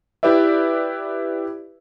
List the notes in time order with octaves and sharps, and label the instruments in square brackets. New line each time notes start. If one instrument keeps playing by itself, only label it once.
[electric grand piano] E4 G4 B4 D5 E5